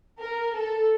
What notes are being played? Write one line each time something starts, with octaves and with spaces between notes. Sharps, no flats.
A#4
A4